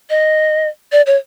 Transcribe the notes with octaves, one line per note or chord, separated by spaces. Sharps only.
D#5
D5
C#5